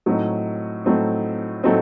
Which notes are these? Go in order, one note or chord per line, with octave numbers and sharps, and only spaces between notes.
A2 F#3 A3 C4 D#4
A2 F#3 A3 C4 D#4
A2 F#3 A3 C4 D#4